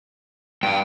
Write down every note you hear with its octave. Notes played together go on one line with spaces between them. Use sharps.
G2 F5 G5